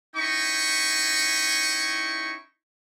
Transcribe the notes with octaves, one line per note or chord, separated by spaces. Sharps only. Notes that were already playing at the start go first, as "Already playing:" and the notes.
C#4 D#4 E4 G5 C#6